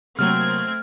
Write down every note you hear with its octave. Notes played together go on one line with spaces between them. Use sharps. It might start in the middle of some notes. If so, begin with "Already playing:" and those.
C3 F#3 A3 A#3 C4 F6 G#6